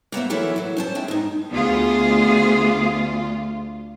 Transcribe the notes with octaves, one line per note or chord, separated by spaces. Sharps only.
A#3 B3 C5 E5
E3 F#3 E4 A4 A#4 E5
E3 F#3
C#4 C5 A5
G#3 C4 E5
G#2 D#4
D2 B3 F4 G#4